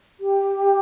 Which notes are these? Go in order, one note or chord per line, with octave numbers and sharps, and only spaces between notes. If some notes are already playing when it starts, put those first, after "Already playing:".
G4